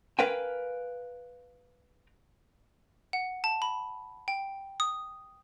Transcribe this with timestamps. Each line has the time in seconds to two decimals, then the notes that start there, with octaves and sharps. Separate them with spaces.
0.19 A#4 B4 F5 G5 G#5
3.13 F#5
3.44 A5
3.62 B5
4.28 G5
4.80 D#6